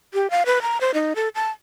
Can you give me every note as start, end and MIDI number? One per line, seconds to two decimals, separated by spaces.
0.14 0.30 67
0.31 0.43 77
0.46 0.62 71
0.62 0.80 82
0.81 0.91 72
0.94 1.13 63
1.16 1.29 69
1.35 1.50 81